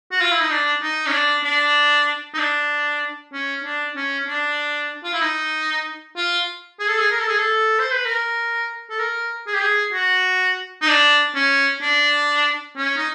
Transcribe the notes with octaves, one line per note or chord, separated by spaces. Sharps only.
F#4
F4
E4
D#4
D4
D#4
C#4
D4
D4
D#4
D4
C#4
D4
C#4
D4
F4
E4
D#4
F4
G#4
A4
G#4
A#4
A4
G#4
A4
C5
B4
A#4
A4
A#4
G#4
G4
G#4
F#4
D#4
D4
C#4
D4
C#4
D#4